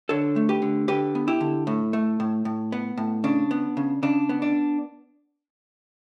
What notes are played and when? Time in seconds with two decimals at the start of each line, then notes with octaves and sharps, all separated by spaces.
0.09 D3 A4 C#5
0.36 A3
0.49 G4 B4
0.62 D3
0.88 D3 G4 B4
1.15 B3
1.28 E4 G4
1.41 D3
1.67 A2
1.93 A3
2.20 A2
2.45 A2
2.72 B3
2.98 A2
3.24 C#3 D4
3.51 B3
3.77 C#3
4.03 C#3 D4
4.29 B3
4.42 D4